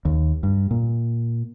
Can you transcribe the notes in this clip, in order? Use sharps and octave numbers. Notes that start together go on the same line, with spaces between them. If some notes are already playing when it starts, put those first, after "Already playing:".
D#2
G2
A#2